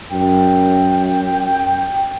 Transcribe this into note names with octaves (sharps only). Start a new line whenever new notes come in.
F#2 G5